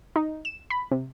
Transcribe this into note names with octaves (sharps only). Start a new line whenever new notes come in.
D#4
E7
B5
C3